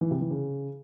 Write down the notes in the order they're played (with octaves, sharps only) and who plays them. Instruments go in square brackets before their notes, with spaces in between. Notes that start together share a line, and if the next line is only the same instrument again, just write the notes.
[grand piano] E3
C3
E3
C#3